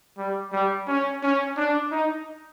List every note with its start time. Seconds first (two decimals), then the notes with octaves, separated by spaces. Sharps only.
0.18 G3
0.52 G3
0.88 C#4
1.23 C#4
1.57 D4
1.92 D#4